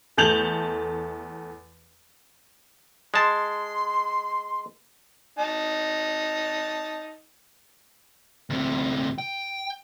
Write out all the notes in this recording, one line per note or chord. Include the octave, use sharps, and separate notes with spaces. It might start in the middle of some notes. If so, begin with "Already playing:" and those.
E2 A3 A5 G6 F7 F#7
G#3 A5 C6
D#4 A5
D2 C3
G5